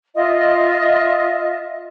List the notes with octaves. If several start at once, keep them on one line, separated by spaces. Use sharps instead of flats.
F4 D#5 E5